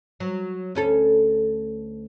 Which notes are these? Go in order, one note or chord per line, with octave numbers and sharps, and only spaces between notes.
F#3
D2 C#4 A4